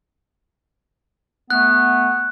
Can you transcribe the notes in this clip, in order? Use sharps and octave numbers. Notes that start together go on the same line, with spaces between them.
A3 B3 F#6